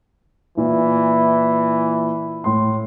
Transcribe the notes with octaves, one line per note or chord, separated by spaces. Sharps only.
A#2 E3
A2 C6